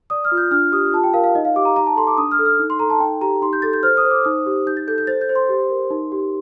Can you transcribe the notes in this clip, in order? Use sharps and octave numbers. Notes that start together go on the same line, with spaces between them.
D5 D#6
F6
F4
G6
D4 F6
G4 D#6
F4 A5
G5
A#4 F5
F5
D#4 D#5
F5
G4 D6
A#5
D#4 A#5
A5
A4 C6
D6
D4 D#6
F6
A4
F6
D#4
C6
A4 A#5
A5
D#4 G5
G4 A#5
D#4 C6
G6
A4 A6
G6
C5 F6
D#6
C5
D6
D#4 D#6
G4
D#4 G6
A6
A4 G6
G6
C5 A6
G6
C5
C6
G4
A#4
D#4
G4